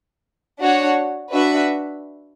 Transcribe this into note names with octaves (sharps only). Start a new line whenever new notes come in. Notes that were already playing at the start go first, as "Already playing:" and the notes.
D4 F#4 C#5
D4 F#4 B4 E5